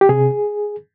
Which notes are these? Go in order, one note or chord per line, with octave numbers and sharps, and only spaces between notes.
G4
C3 G#4